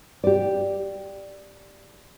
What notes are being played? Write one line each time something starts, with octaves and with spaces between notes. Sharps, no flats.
G4 D5